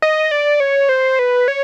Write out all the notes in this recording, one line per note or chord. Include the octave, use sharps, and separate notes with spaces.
D#5
D5
C#5
C5
B4
C#5